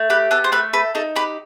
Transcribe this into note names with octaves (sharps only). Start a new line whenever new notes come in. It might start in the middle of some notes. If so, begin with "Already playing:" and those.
Already playing: A3
G4 B4
B3 A4
C5
A3 B4
A4 B4
D#4 A4
G4 B4